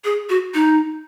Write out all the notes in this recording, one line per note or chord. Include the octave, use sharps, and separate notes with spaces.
G#4
F#4
D#4